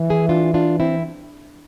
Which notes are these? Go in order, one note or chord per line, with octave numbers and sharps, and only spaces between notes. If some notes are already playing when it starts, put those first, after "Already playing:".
Already playing: E3
E4 G#4
D4 F4
D4 F4
C4 E4